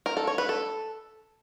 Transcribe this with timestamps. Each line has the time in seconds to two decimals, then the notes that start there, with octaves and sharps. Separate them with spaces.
0.06 A#4
0.17 A4
0.27 C#5
0.38 B4
0.49 A4